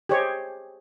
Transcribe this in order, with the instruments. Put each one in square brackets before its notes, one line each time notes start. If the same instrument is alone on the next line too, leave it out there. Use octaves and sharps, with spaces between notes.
[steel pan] G4 G#4 C5 C#5 D#5